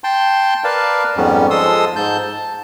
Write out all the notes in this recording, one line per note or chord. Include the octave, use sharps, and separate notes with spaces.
G5 A5 C6
A#4 B4 D5 F5 A5
F2 G#2 G3 B3 C#4
F3 G#3 A4 C6 D#6 E6
G#2 A5 G6
A5